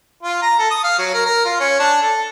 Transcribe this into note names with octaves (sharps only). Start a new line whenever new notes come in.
F4
A#5
A4
D#6
F5
F#3
A#4
A#4
F4
C#4
D4
A4